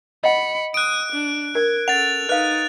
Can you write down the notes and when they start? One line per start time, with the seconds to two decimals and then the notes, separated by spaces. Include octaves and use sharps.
0.24 D#5 F#5 B5 C#7
0.74 D#6 F#6 D7
1.12 D4
1.55 A#4 G#6
1.88 C#4 A4 F#5 A6 F7
2.29 D#4 B4 F5 F#6